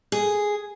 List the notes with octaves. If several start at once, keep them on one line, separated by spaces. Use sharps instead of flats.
G#4